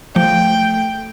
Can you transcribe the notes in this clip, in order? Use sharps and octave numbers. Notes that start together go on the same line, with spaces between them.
F3 A3 G5